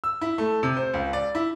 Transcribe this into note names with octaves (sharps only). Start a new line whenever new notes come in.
E6
E4
A3
C3
C5
C#2
D5
E4